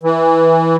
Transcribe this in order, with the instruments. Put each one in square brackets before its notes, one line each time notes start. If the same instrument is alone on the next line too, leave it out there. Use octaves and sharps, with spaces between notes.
[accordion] E3